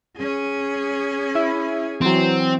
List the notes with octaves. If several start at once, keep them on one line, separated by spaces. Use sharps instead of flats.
C#4 G#4
E4
E3 F#3 C4